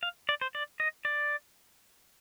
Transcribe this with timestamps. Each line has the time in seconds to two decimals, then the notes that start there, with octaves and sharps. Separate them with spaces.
0.03 F5
0.29 D5
0.41 C5
0.55 D5
0.80 D#5
1.05 D5